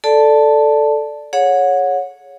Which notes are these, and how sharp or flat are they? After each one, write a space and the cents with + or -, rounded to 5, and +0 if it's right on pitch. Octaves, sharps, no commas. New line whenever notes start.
A4 +0 D5 +0 A5 +0
G#4 +0 C#5 +0 F#5 -25